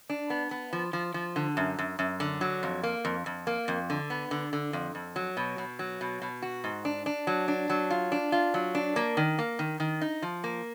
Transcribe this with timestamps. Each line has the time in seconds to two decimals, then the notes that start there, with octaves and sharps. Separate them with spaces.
0.10 D4
0.30 B3
0.51 B3
0.73 F3
0.93 F3
1.14 F3
1.36 D3
1.57 F#2
1.78 F#2
1.99 F#2
2.20 D3
2.41 F#3
2.63 F2
2.83 A#3
3.05 F2
3.26 F2
3.47 A#3
3.68 F2
3.90 D3
4.10 B3
4.31 D3
4.53 D3
4.73 F2
4.95 F2
5.16 F#3
5.37 B2
5.58 B2
5.79 F#3
6.01 B2
6.22 B2
6.42 F#4
6.64 G#2
6.85 D4
7.06 D4
7.27 F#3
7.48 D4
7.70 F#3
7.90 F4
8.12 D4
8.32 F4
8.54 F#3
8.75 D4
8.96 A#3
9.17 D#3
9.39 A#3
9.59 D#3
9.80 D#3
10.01 D#4
10.22 F3
10.44 A#3